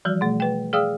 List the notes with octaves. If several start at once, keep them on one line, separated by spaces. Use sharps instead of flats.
E3 F3 G3 F#4
B2 A3
B4 G5
G#4 D5 F5 G5 D#6 E6